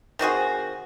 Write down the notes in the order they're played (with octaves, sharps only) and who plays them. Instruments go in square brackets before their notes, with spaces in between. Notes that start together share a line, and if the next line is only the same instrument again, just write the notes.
[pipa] D#3 C4 F#4 G#4